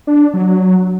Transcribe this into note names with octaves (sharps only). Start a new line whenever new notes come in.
D4
F#3